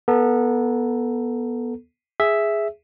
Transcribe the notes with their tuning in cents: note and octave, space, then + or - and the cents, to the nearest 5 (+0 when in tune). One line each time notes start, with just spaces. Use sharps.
B3 -20 A4 +0 A#5 +0
G#4 +0 E5 +0